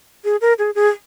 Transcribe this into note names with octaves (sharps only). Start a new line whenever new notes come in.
G#4
A#4
G#4
G#4